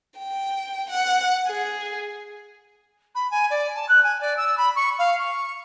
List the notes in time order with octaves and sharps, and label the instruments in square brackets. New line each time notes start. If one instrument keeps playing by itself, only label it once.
[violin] G5
F#5
G#4
[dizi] B5
G#5
D5
A5
F#6
G#5
D5
E6
B5
C#6
F5
C#6